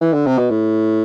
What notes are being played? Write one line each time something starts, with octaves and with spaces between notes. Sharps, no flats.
E3
D3
C3
B2
A2